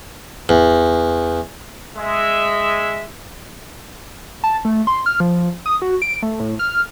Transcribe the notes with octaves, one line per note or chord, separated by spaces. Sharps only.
E2
G#3 E5
A5
A3
C6
F6
F3
D#6
F#4
D7
A3
A2
F6